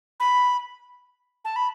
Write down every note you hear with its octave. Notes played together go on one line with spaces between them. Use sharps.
B5
A5
B5